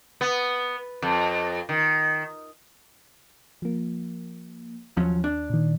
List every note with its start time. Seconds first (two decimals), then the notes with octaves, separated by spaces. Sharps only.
0.21 B3
1.02 F2
1.69 D#3
3.62 F3 A#3
4.97 D#2 F3 F#3 C#4
5.24 D4
5.50 A#2 D#3